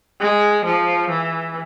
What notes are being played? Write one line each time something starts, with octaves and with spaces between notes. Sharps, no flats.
G#3
F3
E3